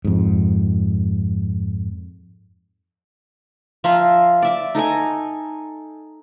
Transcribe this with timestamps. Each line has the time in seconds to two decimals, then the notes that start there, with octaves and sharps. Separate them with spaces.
0.05 F2 G#2
3.84 F3 F4 E5 A#5
4.42 D5 E5 D6
4.75 D#4 A4 D#5 G#5